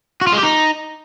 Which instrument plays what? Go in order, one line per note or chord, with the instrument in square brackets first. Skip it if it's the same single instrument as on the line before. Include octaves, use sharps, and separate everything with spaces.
[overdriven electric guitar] F#4
F4
G#3
G4
D#4